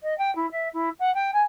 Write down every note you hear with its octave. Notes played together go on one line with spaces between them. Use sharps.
D#5
G5
E4
E5
E4
F#5
G5
G#5